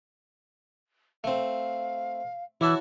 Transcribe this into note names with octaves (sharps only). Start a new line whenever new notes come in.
A3 C4 F5
E3 E4 F#4 C#5 A5